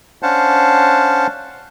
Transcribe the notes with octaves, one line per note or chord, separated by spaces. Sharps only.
C#4 D4 C5 F5 F#5 A5